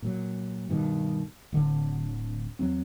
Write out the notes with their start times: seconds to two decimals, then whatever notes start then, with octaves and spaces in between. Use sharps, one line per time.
0.02 A#2 F#3
0.69 G2 B2 D#3
1.52 D1 D3
2.59 E2 F#3 C4